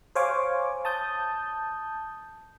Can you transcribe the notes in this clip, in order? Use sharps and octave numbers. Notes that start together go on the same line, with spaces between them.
C5 C#5 F5 G#5 C#6 D6
A5 D#6 G6